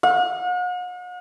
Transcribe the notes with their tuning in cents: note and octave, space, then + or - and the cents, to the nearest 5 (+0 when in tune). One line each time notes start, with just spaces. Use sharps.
F#5 -45